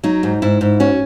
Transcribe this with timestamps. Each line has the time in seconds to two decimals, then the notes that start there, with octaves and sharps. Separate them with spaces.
0.04 F#3 D#4
0.23 G#2
0.42 G#2 E4
0.61 G#2
0.80 C#4 F#4